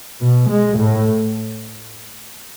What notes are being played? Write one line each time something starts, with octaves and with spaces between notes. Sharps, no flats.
B2
G#3
A2